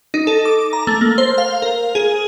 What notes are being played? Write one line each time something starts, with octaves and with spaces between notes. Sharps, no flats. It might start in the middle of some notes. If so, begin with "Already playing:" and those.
D#4
A4
D6
A#5
A3
A#3
C5
F5
A#4
G#4